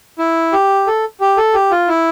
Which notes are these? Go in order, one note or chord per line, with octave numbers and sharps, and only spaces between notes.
E4
G4
A4
G4
A4
G4
F4
E4